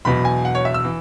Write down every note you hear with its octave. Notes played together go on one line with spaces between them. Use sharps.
E1 E2 B2 F#3 B5
G#5
F#5
C#5
E5
E6
E3